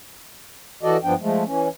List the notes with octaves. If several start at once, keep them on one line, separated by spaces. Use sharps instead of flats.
E3 F#4 A4 D5 D#5
G2 F3 B3 D4 G5
F3 G#3 A3
E3 C#4